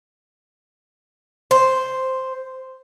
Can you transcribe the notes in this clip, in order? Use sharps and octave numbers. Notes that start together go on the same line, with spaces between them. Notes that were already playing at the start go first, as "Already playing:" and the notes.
C5